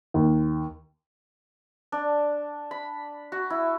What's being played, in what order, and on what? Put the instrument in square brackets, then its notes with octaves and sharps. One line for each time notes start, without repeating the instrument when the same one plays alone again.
[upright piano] D#2
[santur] D4
B5
F#4
E4